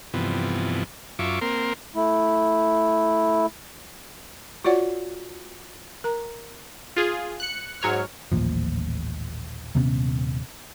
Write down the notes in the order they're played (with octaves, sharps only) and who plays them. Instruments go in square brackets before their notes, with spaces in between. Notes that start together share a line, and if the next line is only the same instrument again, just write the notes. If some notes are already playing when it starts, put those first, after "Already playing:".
[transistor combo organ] G2 C3 E3 F3 B3
F#2 F4 E5 C#6 D6
A#3 C4 A#4 C6
[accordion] A3 E4
[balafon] F4 F#4 C#5 D5 F#5
A#4 A#5
[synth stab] F4 G#4
F#6 C#7
G#2 F#3 C#5 F6
[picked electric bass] D#1 A1 A#2 F3
D#1 C3 B3 C#4